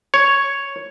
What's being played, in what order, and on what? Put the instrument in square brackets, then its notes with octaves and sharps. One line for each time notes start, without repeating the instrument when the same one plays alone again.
[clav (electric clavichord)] C#5